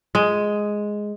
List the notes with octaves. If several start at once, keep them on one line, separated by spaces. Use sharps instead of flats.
G#3